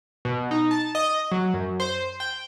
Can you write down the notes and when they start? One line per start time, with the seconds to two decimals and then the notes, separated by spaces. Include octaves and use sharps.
0.25 B2
0.51 D#4
0.71 A5
0.95 D#5
1.32 F#3
1.54 F#2
1.80 C5
2.20 G5